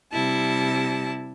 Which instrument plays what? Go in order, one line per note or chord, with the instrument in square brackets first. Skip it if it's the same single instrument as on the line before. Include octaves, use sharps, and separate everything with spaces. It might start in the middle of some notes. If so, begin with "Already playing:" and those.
[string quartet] C3 G3 E4 A5